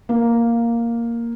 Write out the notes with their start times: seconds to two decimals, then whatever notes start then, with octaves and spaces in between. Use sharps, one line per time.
0.09 A#3